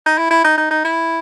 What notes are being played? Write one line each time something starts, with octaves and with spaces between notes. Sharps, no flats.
D#4
E4
E4
D#4
D#4
D#4
E4